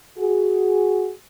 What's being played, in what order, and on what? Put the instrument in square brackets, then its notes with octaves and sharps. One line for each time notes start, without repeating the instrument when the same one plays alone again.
[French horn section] F#4 G#4